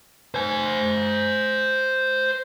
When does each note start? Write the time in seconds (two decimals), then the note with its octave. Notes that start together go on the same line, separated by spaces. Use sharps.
0.34 C5 G#5